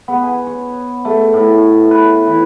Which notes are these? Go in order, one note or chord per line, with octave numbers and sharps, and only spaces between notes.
B3
G#5
C#5
A3
A2
B4
E3